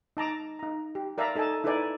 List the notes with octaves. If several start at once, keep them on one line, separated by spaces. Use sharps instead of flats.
D#4 A5 A#5 D6
D#4 A#5
G4
A#4 D5 E5 F5 A5 A#5
D#4 A4 D#5 G#5 A5
D#4 E4 A4 B4 D5 G#5